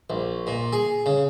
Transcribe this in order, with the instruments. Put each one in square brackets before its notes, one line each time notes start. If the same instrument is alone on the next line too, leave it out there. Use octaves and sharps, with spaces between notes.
[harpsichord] A#1
A#2
G#4
C#3